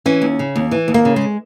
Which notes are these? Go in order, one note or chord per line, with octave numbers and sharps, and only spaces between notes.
E3 C#4
D#2
C#3
D#2
E3
D#2
A#3
C#3
G#3